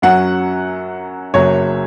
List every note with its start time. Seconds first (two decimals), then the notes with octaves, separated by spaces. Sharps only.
0.02 F#2 F#3 C#4 F#5
1.34 F#1 F#2 F#3 C#5